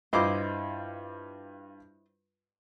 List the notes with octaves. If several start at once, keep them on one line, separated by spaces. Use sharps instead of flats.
G2 E4 F4 C5 D#5 D6